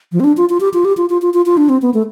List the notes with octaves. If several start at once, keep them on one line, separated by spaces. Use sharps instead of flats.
F3
C4
D4
F4
F4
G4
F4
G4
F4
F4
F4
F4
F4
D4
C4
B3
A3